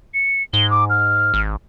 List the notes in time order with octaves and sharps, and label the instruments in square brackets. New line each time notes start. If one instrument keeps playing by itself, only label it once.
[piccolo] C#7
[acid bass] G#2 [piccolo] G7
[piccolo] D6
F6
[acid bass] G#1